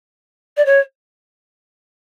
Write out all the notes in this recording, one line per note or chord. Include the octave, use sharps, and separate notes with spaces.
D5
C#5